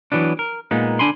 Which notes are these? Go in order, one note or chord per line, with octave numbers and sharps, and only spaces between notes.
E3 F#3 B3 D4
A#4
A#2 G#3 A#3 B3 D#4
D3 D4 G#5 B5 C6